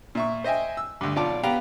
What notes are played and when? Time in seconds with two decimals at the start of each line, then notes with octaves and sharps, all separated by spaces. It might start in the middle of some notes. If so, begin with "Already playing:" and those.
0.15 A#2 E5 C#6
0.44 C5 D#5 E5 G5 G#5
0.77 E6
1.01 D2 G2
1.16 B1 F4 D5 A5 D6
1.43 B3 G4 F5 G5 A#5